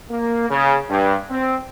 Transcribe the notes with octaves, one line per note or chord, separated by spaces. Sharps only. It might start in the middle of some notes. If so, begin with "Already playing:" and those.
A#3
C#3
G2
C4